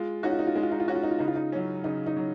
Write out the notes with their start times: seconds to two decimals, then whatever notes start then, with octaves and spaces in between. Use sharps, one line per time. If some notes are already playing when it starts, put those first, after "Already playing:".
Already playing: G#3 F4
0.23 C#4 D#4 F#4
0.32 F4
0.39 D#4
0.47 F4
0.56 G#3 D#4
0.63 F4
0.72 D#4
0.80 F4
0.87 C#4 D#4 F#4
0.95 F4
1.03 D#4
1.11 F4
1.19 C#3 D#4
1.28 F4
1.36 D#4
1.52 F#3 C#4
1.84 C#3 D#4
2.06 D#4
2.16 F#3